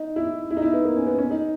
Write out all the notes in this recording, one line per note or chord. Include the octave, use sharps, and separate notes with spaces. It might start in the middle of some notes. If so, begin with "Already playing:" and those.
Already playing: D#4
E4
E4
D#4
E4
B3
A#3
C#4
B3
C#4
D#4